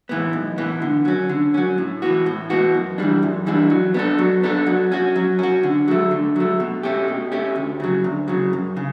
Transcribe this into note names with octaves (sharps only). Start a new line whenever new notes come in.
A2 E3 B3
B1
A2 E3 B3
D3
F#3 C#4
D3
F#3 C#4
A2
E3 B3 F#4
A2
E3 B3 F#4
F#2
E3 G3 D4
F#2
E3 G3 D4
F#3
B3 D4 A4
F#3
B3 D4 A4
F#3
C#4 F#4
F#3
C#4 F#4
D3
F#3 A3
D3
F#3 A3
B2
A3 C#4 G4
B2
A3 C#4 G4
D2
C#3 F#3
D2
C#3 F#3
F#2
C#3